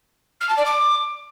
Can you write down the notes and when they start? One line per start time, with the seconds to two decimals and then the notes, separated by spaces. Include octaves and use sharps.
0.40 F6
0.49 A5
0.57 D5
0.65 D6